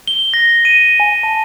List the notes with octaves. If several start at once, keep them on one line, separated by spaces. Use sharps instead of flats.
G7
A#6
D#7
G#5
A5